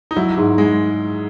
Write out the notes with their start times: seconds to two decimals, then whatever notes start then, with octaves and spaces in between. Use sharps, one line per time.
0.11 D#4
0.16 F#3 E4
0.37 G#2
0.58 G#3